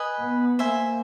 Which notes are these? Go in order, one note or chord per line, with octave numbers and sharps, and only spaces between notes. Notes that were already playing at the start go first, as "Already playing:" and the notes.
Already playing: B4 D#5 G#5
B3
A#3 C5 E5 G#5